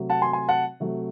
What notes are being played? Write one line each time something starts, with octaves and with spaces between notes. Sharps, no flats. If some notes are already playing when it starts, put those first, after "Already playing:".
Already playing: C3 F#3 A3
F#5 A5
G#5 C6
G#5 C6
F#5 A5
C3 F#3 A3